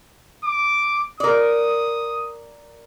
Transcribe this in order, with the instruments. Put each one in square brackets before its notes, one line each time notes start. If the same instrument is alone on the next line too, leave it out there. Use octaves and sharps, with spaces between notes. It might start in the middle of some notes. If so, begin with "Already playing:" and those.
[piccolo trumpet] D6
[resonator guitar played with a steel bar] A#4 D5 [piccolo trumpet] D#6